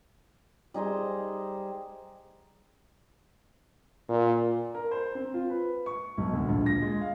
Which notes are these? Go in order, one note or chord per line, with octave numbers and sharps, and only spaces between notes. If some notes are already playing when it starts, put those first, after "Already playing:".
G3 D#4 G#4 C5
A#2
A#4
C5
C4
F4
B4
C#6
B1
D2
A#1
A#6
G#3
F5